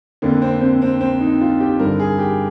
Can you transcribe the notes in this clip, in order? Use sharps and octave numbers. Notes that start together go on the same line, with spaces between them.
F2 D3 A#3
C4
C4
C4
C4
D#4
F4
G4
G2 A#4
D3
G#4
G4